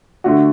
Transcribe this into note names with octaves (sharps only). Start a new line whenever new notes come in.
D3 A3 D4 F#4